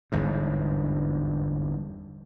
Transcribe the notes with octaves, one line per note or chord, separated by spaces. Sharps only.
G1 E2 G#2